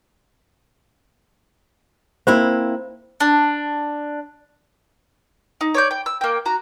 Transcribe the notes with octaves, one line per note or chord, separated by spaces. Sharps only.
A#3 C4 E4 C5 B5
D4
D#4
C#5 D5 G6
G5
E6
A#3 G5
F#4 A#5